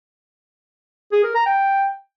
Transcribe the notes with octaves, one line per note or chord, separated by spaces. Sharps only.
G#4
A#4
A#5
G5